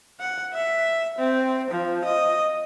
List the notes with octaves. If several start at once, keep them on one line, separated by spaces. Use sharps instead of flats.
F#5
E5
C4
F3
D#5